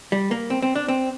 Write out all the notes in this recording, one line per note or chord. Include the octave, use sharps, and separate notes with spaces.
G3
A#3
C4
C4
D4
C4